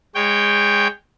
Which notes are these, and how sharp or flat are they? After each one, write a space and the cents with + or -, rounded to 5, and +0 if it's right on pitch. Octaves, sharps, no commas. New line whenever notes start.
G#3 -15 C#5 +0 G5 +0